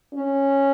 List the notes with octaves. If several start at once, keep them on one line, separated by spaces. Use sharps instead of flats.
C#4